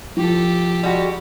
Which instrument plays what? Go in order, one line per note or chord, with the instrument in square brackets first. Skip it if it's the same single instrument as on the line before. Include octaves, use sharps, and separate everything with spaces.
[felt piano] F3 [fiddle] G4 A4
[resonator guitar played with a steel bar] G3 G#3 F#4